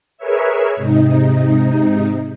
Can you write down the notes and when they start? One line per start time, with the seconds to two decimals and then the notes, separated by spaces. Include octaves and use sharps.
0.18 G#4 A#4 B4 C#5 E5
0.76 G#2 C3 D#4